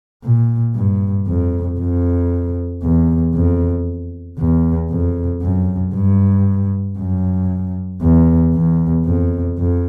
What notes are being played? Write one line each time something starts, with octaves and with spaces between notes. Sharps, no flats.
A#2
G2
F2
F2
E2
F2
E2
F2
F#2
G2
F#2
E2
E2
F2
F2